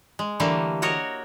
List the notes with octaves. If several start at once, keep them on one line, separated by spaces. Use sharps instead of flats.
G#3
D3 E3 G3 A3 A#3
F#4 A#4 C#5 D#5